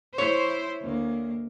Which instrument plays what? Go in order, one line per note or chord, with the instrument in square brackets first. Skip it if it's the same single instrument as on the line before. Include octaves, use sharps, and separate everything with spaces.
[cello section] E4 C5 [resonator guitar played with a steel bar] C#5
[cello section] D2 A#3